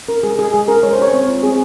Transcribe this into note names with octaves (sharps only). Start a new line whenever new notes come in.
C#4 A#4
G#3 G#4
G4 G#4
G#3 G#4
C#4 A#4
G#3 C#5
C5
C#4 C#5
C4
F4
C4 G#4